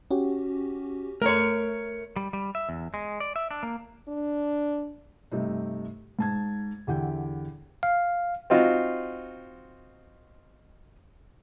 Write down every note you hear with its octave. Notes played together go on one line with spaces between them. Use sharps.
C#4 F#4 G4
A3 A#4 C#5
G3
G3
E5
E2
G#3
D5
E5
D4
A#3
D4
G2 C3 A3 D#4
G#2 A5 G#6
E2 D3 G4 E5 F#5 G5
F5
C4 D#4 F4 F#4